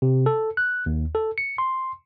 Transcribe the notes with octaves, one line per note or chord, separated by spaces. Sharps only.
C3
A4
F#6
D#2
A4
C#7
C6